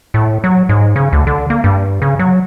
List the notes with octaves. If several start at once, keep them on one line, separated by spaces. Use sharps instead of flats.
A2
F#3
G#2
C#3
D2
D3
A#3
G2
C#3
F#3